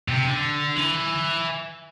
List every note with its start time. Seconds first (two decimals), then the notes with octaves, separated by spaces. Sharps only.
0.08 C3
0.25 D3
0.76 E3